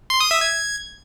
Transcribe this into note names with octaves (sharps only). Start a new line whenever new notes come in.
C6
D#6
E5
G#6